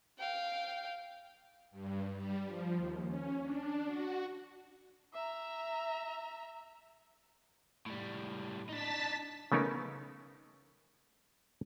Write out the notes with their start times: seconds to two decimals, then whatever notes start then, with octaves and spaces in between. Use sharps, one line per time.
0.18 F5 G5
1.71 G2
2.16 G3
2.46 F3
2.76 D#2
3.07 C#4
3.42 D4
3.87 F#4
5.14 E5 A#5
7.86 A2 G3
8.69 D4 D#4 A5 A6 B6
9.52 C#3 A3 B3 C#4 D#4 A#4